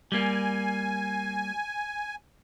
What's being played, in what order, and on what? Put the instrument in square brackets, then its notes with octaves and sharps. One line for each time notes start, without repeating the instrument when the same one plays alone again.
[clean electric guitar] G3 A#3 [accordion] G#5